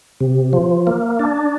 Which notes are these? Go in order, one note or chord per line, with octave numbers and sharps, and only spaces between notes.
C3
F3
A#3
D4